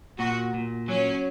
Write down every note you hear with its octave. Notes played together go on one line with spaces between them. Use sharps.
A#2 F#4
A#2
F#3 C#4